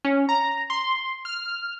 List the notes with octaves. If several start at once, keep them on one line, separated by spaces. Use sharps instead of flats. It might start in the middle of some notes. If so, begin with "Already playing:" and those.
C#4
A#5
C6
F6